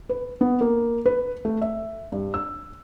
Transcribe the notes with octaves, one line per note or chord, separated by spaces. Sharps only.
B4
B3
A#3
B4
A3
E5
G2
E6